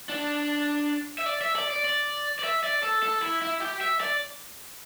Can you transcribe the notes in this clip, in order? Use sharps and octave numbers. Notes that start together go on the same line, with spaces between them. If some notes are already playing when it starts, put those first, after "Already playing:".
D4
E5
D5
E5
D5
D5
D5
D5
E5
D5
A4
A4
E4
E4
G4
E5
D5